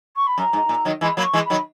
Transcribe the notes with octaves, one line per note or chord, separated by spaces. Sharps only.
C#6
B5
F#2 A#5
G#2
A#2
D#3 F#3
E3 G#3 B5
F#3 A#3 B5
C#6
E3 G#3
B5
D#3 F#3